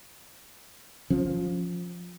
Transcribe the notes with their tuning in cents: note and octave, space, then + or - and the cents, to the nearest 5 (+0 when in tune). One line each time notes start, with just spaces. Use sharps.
F3 +10 C#4 -5